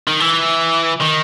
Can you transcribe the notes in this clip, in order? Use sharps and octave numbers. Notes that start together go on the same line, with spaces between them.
D#3
E3
D#3